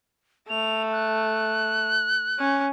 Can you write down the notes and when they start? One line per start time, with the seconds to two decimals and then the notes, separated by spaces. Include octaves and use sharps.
0.50 A3 F7
0.92 F#6
2.39 C#4